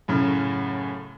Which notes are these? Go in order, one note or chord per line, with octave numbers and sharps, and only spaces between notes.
F#2 A2 C#3